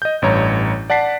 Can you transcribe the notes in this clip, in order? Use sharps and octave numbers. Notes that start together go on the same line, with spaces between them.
D#5 G6
A1 G2 C#5 A#5
D5 F#5 A5 B6 C7